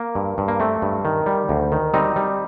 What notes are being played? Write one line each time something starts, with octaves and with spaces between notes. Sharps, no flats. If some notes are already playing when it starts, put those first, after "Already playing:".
Already playing: A#3
G2
G2
A#3
A3 C4
G2
D#3
G3
D2
D#3
G3 C4 D#4
G3